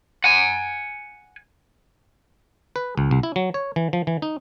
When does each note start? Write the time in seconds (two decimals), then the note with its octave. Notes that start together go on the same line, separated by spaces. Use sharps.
0.24 F#5 G#5
2.76 B4
2.97 C#2
3.11 C2
3.23 E4
3.36 F#3
3.54 C#5
3.76 E3
3.93 F3
4.07 E3
4.22 D#4